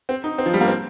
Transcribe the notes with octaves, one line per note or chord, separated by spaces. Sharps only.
C4
D#4
C4
F3
G3
A#3
C4